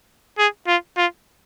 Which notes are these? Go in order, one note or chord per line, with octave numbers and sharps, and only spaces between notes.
G#4
F4
F4